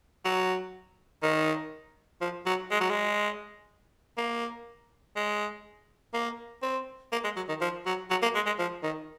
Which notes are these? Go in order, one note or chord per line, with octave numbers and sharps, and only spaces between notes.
F#3
D#3
F3
F#3
G#3
F#3
G#3
A#3
G#3
A#3
C4
A#3
G#3
F#3
D#3
F3
F#3
F#3
A#3
G#3
G#3
F3
D#3